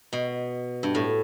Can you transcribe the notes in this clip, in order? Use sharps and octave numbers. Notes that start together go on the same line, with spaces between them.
B2
G2
A2